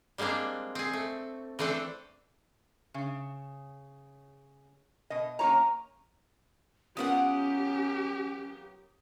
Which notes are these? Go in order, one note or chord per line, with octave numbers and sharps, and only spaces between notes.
G3 G#3 A#3 C4 D4
C4 G#4
A3
E3 A3 C4 D4 A4
C#3
B2 D#5
A#3 C#4 D#4 F#4 C#5 A#5
F#3 B3 C#4 F4 G4 A#4 F#5 D#6